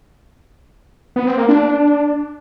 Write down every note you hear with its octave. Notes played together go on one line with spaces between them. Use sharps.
B3
C4
A#3
D4